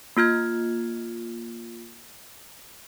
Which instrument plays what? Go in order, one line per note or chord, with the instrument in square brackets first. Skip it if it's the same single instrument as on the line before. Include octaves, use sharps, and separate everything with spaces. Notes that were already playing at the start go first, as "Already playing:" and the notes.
[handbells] A#3 F4 F6 G#6